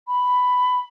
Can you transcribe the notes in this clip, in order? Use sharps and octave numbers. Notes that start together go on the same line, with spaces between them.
B5